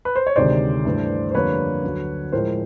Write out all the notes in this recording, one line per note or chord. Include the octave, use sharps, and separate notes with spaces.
B4
C5
C#5
D2 C3 D#3 G#3 C5 D5
G2 E3 A3
C5
F2 D3 G3 A#3 B4 C#5
D2 D3 F#3
A2 F3 G#3 A#4 C5